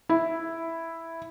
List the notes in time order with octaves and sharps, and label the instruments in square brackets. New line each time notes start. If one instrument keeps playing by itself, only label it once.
[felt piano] E4